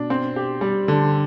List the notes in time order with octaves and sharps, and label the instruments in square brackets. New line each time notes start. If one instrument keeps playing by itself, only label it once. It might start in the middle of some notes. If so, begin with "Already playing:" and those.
Already playing: [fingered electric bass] B2 [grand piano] D4
[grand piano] C4
G4
G3
D3